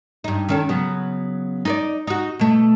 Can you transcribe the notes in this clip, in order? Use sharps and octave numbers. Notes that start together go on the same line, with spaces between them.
G2 D#4
D#3 C#4 A4
C#3 F#3 B3
D#4 B4 D5
D#4 F#4
B2 A3